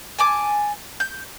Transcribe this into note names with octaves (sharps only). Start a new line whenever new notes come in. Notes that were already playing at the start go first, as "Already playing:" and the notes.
G#5 A5 D6
G6